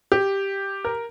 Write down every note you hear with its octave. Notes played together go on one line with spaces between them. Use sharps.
G4
A#4